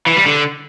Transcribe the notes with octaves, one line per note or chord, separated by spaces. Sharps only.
E3
G3
D3